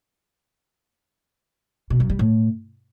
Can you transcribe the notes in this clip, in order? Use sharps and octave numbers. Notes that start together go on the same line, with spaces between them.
B2
F#2
G3
A2